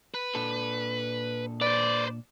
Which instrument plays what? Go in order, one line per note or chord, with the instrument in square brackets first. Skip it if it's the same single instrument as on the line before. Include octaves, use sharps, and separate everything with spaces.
[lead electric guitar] B4
[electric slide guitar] A#2 D4 A4
[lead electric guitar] B4 C5 [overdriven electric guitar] D5